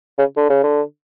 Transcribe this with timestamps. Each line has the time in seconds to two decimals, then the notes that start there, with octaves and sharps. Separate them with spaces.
0.18 C#3
0.37 D3
0.50 C#3
0.63 D3